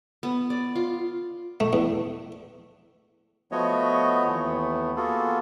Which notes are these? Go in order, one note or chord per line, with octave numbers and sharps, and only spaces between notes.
B3
D5
F4
A3
E2
F3 A3 B3 F#4 C#5 D#5
D#2 E3 A3 B3
A#3 B3 F4 F#4 G#4 A4